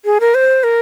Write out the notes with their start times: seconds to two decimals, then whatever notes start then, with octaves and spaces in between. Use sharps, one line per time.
0.05 G#4
0.20 A#4
0.35 C5
0.64 A#4